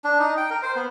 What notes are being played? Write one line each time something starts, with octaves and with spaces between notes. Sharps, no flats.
D4
D#4
G5
A#4
C5
B3